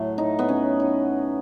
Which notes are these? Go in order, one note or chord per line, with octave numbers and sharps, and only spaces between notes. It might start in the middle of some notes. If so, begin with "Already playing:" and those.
Already playing: A2 F#3 A3
D#4
B3
C#4
D#4